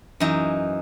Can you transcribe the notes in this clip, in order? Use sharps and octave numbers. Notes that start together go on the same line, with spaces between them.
F#2 E3 D#4 A#5